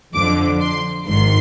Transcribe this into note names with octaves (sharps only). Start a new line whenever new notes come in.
F2 D3 F3 D6
C6
G#1 G#2 D#3 C6